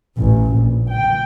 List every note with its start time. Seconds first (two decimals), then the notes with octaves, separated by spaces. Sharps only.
0.18 A1
0.54 A#1
0.90 G5